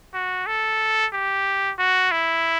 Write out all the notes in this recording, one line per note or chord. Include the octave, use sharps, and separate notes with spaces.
F#4
A4
G4
F#4
E4